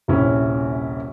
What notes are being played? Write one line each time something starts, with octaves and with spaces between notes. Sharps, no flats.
D#1 A#1 C3 C#4 E4